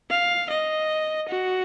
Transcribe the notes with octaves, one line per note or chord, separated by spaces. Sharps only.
F5
D#5
F#4